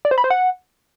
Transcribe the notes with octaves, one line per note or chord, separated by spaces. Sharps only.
D5
C5
B5
C5
F#5